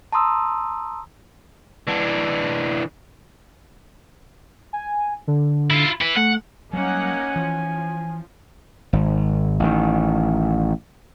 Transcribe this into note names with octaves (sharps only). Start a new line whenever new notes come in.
A5 A#5 C6 D#6 E6
E3 D4
G#5
D3
E4 F4
E4 B4
A3 F#5
F#3 G3 A#3 C#4 D#4 F#5 G#5
E3 F3
G#1
A1 D#3